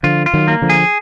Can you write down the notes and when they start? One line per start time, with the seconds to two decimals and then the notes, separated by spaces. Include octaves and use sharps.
0.03 D3 F3 F4
0.26 F4
0.34 D#3 F#3
0.48 A#3
0.62 D3 F3
0.69 G#4